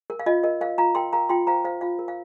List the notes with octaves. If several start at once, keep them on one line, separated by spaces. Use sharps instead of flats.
A#4
F5
F4 D#5
A#4 D#5
A#4 F5
F4 F5 A#5
A#4 G5 C6
A#4 F5 A#5
F4 G5 C6
C5 F5 A#5
C5 F5
F4 F5
A#4
F5